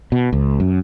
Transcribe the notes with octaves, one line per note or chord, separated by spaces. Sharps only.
B2
C#2
F#2